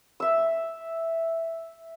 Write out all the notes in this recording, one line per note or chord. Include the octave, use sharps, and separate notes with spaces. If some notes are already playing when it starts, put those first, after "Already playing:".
E5 E6